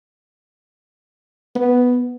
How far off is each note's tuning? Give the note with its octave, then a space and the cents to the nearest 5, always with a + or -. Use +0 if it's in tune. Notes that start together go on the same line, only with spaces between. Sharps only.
B3 +0